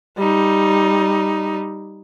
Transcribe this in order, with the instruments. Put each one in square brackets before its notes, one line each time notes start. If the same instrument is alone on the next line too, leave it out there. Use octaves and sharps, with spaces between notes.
[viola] G3 D#4